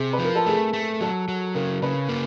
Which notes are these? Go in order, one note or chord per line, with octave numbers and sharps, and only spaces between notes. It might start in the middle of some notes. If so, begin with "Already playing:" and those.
Already playing: C3 G#4
B4
F3
A#4
A4
A3 G#4
A3
F#3 A4
F#3
C#3 A#4
C#3 B4
A#3